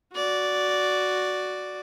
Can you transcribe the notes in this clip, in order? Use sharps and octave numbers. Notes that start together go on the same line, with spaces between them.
F#4 D5